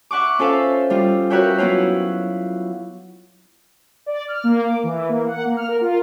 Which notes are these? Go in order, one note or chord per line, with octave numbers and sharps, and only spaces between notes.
E5 F#5 C#6 D6
C#4 F4 A4 C5 E5 F5
G3 F4
F#4 A#4 B4 C#5 E5 G5
F#3 B3 E4 F4 F5
D5
F6
A#3
D6
E3
A#3
F#5
A#3
F6
A#4
F4